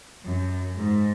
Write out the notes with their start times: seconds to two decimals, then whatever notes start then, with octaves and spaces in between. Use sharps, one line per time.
0.25 F#2
0.79 G#2